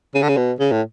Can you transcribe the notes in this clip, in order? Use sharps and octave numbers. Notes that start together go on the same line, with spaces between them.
C#3
D3
C#3
B2
C#3
A2